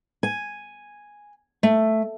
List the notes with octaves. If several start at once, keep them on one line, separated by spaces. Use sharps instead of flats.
G#5
A3